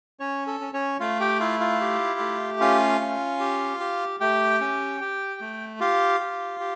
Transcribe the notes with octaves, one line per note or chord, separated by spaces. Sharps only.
C#4 C#5
A4
C#4
C#4 C#5
A3 F4 F5
G4 G5
E4 F4 F5
F4 F5
G4
A3
C#4 F4 F5
C#4
G4
G4
A3 G4 G5
C#4
G4
A3
F4 G4 F5
G4
G4